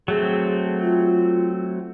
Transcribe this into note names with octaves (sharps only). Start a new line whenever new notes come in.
F#3 A3 C4 G#4
F4